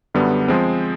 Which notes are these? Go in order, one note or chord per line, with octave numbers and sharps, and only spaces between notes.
F#2 D3 G3 B3
F3 G#3 C4